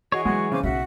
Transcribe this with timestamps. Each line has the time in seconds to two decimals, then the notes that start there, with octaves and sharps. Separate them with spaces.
0.12 E3 F#4 G#4 C#5 D#5 C#6
0.25 F#3 G#3 F#4 F#5
0.52 C#3 C5 G#5 D6
0.63 B1 B3 F#4 E5 F#5